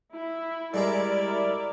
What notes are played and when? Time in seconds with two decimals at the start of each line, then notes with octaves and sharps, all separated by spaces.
0.13 E4
0.74 G3 G#3 E4 A#4 D5 E5